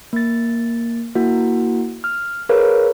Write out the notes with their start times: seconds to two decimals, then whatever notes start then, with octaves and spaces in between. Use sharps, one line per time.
0.13 A#3 A6
1.15 A#3 E4 F#4
2.04 F6
2.49 G#4 A#4 B4 C#5 F5